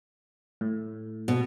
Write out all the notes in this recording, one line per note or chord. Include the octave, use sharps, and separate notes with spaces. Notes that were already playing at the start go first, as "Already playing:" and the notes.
A2
B2